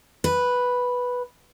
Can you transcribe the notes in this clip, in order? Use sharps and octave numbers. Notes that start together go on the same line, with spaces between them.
B4